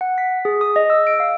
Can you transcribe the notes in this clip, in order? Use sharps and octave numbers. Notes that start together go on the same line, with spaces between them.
F#5
B6
G#4
D#6
D#5
E6
D7
F5